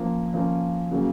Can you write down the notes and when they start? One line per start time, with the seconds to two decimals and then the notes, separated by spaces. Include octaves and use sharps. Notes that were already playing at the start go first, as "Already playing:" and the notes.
Already playing: F3 A#3 C#4
0.34 F3 A#3 C#4
0.91 C#3 F#3 A#3 C#4